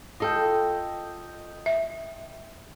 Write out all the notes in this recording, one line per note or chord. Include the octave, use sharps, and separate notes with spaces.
F4 A4 D#5 G5
E5